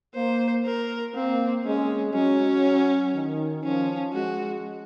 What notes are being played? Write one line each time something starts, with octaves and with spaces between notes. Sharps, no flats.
A#3 C5
A#4
A#3 C4
G#3 C#4
F#3 C#4
D#3
F3 C#4
G#3 F#4